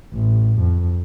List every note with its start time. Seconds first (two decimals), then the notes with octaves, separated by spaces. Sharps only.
0.14 A1
0.60 F2